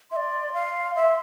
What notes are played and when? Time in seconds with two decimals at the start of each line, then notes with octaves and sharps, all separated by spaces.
0.11 E5 C6
0.16 D5
0.53 F5
0.96 E5